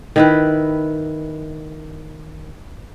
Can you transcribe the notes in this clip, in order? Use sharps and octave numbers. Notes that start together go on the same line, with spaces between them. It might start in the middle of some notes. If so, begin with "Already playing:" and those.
D#3 E4 B4